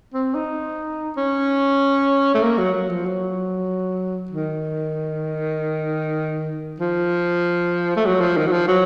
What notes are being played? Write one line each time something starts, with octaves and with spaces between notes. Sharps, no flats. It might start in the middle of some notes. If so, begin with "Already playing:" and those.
C4
D#4
C#4
A3
A#3
F#3
F#3
F3
F#3
D#3
F3
A3
F#3
F3
D#3
F#3
F3
F#3